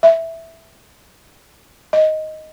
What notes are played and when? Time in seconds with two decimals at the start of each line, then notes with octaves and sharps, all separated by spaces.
0.03 E5
1.93 D#5